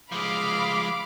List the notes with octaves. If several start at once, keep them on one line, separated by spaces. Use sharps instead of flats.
F3 G#3 F5 B5 D6